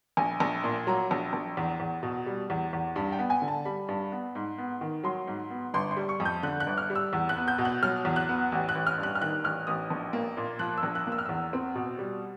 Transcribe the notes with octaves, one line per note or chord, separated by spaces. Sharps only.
A#1 G#5
A#1
A#2
F#3 A#5
A#1
A#1
E2
E2
B2
G3
E2
E2
G2 B5
G5
B3
G#5
D3
A5
G3 B5
G2
B3
G#2
B3
D#3
F#3 C6
G#2
B3
G1 C6
C6
G3
C#6
F2
G6
D3 F#6
F#6
G1
F6
G3
E6
E2
F#6
B3
G6
B2
F#6
F#3 F6
E2
F#6
B3
A1
F#6
A1
F6
G2
F#6
F6
D#3 F#6
A1 F6
A1 D#6
A#1
A#3
A#2
F3 F#6
E6
A#1
F#6
A#3
E6
F6
E2 E6
C4
B2
G3